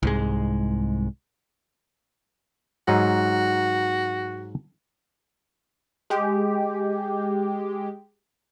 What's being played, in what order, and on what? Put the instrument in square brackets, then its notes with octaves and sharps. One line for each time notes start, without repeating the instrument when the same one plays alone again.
[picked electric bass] C2 G#2 G#3
[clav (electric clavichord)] G#2 F#3 D#4 [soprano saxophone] F#4
[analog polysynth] G#3 G4